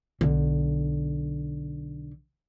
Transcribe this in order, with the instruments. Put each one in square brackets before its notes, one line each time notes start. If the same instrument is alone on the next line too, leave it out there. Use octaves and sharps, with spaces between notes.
[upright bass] B1 D3